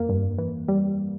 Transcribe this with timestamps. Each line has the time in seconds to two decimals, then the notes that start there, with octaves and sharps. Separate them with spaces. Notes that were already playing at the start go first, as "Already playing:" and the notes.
Already playing: F2 A#3
0.09 G2
0.38 E3
0.68 G3